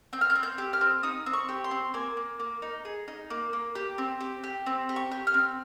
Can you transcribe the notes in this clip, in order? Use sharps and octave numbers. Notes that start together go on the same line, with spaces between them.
C4 G6
F6
G6
C4
G6
G4
F6
C4
D#4 D#6
C4
C#6
G4
C6
C4
A#3 G#5
A#3
A#3
D#4
G#4
D#4
A#3
A#3
G4
C4
G4
G4
C4
G4
C#6
G4
F6
C4